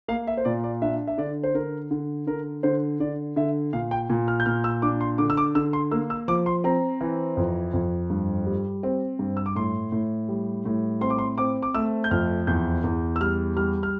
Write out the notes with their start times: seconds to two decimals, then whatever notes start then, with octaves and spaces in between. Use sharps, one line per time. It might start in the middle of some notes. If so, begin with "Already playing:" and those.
0.08 A#3 F5
0.27 E5
0.37 C5
0.45 A#2 D5
0.64 D5
0.82 D4 E5
1.07 E5
1.18 D3 D5
1.43 C5
1.55 D3 A#4
1.91 D3
2.27 D3 A#4
2.63 D3 C5
3.00 D3 D5
3.36 D3 E5
3.73 A#2 F5
3.91 G5
4.10 A#2
4.28 F6
4.40 G6
4.46 A#2 F6
4.64 E6
4.82 D4 D6
5.01 C6
5.18 D3 D6
5.30 E6
5.37 D6
5.55 D3 E6
5.73 C6
5.91 A#3 E6
6.10 E6
6.28 F3 D6
6.46 C6
6.64 C4 A#5
7.01 E3
7.37 F2
7.73 F2
8.10 G2
8.46 G3
8.83 C4
9.19 G2
9.37 E6
9.46 D6
9.55 A2 C6
9.92 A2
10.29 G3
10.65 A2
11.01 C4 C6
11.10 D6
11.18 C6
11.38 C4 D6
11.62 D6
11.74 A3 E6
12.04 G6
12.11 F2 F6
12.47 E2 G6
12.84 E2
13.16 E6
13.20 G3 F6
13.57 G3 F6
13.83 F6